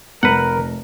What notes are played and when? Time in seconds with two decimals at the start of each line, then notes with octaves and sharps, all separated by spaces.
0.23 F1 A#4 B4 F#5